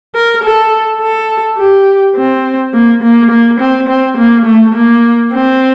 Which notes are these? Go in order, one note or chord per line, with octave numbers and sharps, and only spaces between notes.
A#4
A4
A4
G4
C4
A#3
A#3
A#3
C4
C4
A#3
A3
A#3
C4